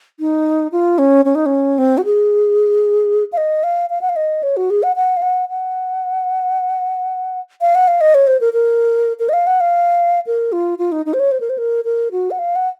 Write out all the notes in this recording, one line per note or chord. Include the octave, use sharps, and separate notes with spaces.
D#4
F4
C#4
C#4
D#4
C#4
C4
F#4
G#4
F5
D#5
F5
F5
F#5
F5
D#5
C#5
F#4
G#4
F#5
F#5
F5
F#5
F#5
F5
F#5
F5
D#5
C#5
C5
A#4
A#4
A#4
D#5
F5
F#5
F5
A#4
F4
F4
D#4
D#4
C5
C#5
C5
A#4
C5
A#4
A#4
F#4
F#5
F5
F#5